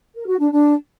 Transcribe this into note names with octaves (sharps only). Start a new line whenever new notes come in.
A#4
F#4
D4
D4